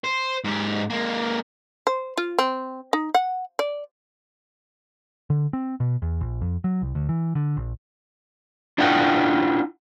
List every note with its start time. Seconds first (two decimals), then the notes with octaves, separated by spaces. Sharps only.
0.04 C5
0.44 G#2 G4
0.90 G#3 A#3
1.87 C5
2.17 F4
2.39 C4
2.93 D#4
3.14 F#5
3.59 D5
5.30 D3
5.53 C4
5.80 B2
6.02 E2
6.21 A#1
6.41 F2
6.64 F#3
6.82 C2
6.95 D2
7.09 E3
7.35 D3
7.57 A#1
8.78 D4 E4 F4 G#4 F#5 G5